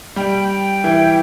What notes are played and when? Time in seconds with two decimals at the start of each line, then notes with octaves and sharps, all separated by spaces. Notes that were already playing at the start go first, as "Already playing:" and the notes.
0.16 G3 G5
0.84 E3